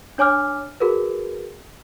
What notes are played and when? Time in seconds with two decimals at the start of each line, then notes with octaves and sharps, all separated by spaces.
0.18 D4 C#5 G#5 D6 F6
0.80 F#4 G#4 A#4 B4